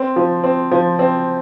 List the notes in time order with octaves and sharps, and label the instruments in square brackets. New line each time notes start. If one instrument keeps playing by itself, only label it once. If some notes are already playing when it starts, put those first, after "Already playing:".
Already playing: [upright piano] C4
F3
C4
F3
C4